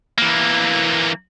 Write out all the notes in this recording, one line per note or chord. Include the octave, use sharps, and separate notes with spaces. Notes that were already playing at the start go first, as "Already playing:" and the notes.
E3 A#3